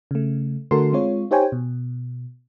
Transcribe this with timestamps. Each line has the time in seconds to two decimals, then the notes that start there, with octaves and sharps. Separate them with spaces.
0.11 C#3 A3
0.71 D3 A3 F#4 A4 A#4 C6
0.93 G#3 C4 F4 C#5
1.31 D#4 G4 C5 C#5 G5 G#5
1.52 B2